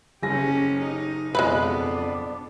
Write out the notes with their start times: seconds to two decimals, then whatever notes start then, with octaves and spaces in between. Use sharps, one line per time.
0.23 F#1 C#4 G4 G#5 A#6
0.80 D#4
1.35 F2 B2 G#3 B3 D4 E4 B4